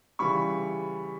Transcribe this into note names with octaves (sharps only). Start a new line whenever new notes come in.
C#3 E3 G3 B5 C#6